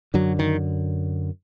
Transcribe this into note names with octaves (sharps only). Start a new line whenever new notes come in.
F#2 D3 F#3
D#3